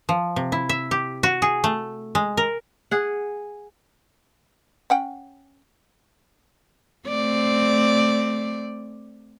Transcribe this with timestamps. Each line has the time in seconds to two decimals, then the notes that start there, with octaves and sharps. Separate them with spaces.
0.09 F3
0.36 C3
0.52 E4
0.69 E5
0.91 G4
1.23 F#4
1.42 G#4
1.64 A3
2.15 G#3
2.37 A#4
2.91 G#4 F#5
4.90 C#4 F#5 G5
7.07 A3 C4 D5